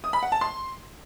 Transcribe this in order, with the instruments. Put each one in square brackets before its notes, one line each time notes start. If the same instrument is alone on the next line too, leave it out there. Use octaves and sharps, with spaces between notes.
[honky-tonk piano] D#6
B5
F#5
A5
C6